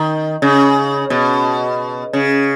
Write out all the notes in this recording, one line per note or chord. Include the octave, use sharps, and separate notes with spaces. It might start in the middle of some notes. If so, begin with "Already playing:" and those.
Already playing: D#3
C#3
B2
C#3